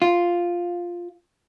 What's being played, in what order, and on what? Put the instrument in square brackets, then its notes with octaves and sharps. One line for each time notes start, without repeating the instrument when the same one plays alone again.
[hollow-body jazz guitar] F4